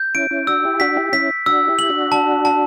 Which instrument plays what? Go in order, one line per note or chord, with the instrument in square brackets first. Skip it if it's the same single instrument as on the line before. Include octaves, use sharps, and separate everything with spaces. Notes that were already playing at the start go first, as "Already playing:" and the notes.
Already playing: [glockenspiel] G6
[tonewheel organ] C#4 E4 [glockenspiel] D7
[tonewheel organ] C#4 E4
[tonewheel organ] D4 F#4 [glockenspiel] E6
[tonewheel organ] E4 G4
[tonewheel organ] D4 F#4 [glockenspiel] B6
[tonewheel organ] E4 G4
[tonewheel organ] C#4 E4 [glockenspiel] B6
[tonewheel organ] D4 F#4 [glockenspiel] E6
[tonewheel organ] E4 G4
[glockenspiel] F#7
[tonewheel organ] D4 F#4
[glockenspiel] A5
A5